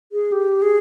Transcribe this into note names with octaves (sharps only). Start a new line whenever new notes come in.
G#4
G4
G#4